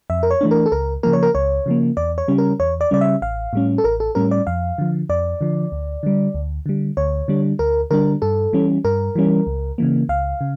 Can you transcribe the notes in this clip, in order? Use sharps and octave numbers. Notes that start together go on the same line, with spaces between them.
F2 E5
A#4
C#5
E3 A3 D4
A#4
A4
C#2 A#4
C#3 F3 A#3 A#4
C#5
A#4
C#2 C#5
C#3 F3 A#3
E2 D5
C#5
C#3 G3 C#4
A#4
E2 C#5
D5
C#3 G3 C#4 D5
E5
A1 F5
A2 G3 C#4
A4
A1 A#4
A4
A2 G3 C#4 A#4
D5
F2 F5
D3 F3
F2 D5
D3 F3
D2
D3 G3
D2
D3 G3
D2 C#5
D3 G3 D4
D2 A#4
D3 G3 D4 A#4
G2 A4
E3 G3 C#4
G2 A#4
E3 G3 C#4
C#2
C#3 E3 A#3
C#2 F5
C#3